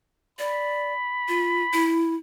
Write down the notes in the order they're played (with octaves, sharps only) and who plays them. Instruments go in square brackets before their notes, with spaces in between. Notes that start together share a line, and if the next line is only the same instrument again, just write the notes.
[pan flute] D5 [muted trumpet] B5
[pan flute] F4
E4